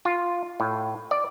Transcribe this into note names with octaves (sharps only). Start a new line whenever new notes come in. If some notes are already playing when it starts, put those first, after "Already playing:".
F4
A2
D5